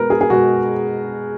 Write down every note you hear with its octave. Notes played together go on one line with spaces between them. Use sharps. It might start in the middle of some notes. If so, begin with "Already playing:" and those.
Already playing: B2 G#3 B3 A#4 B4
G#4
G#4
B2 G#3 B3 F#4